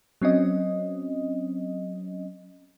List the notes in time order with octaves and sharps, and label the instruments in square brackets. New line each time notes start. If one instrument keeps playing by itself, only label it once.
[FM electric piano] F#3 C4 C#4 D#5